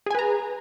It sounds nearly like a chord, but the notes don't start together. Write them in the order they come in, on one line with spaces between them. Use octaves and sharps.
G#4 G#5 B4 A#5